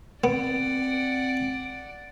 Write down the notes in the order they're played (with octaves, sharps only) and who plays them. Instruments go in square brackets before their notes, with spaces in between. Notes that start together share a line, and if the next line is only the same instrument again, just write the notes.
[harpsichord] B3 [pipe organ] C4 [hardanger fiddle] D5 F#5 [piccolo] D7